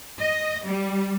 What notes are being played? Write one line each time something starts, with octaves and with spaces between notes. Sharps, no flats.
D#5
G3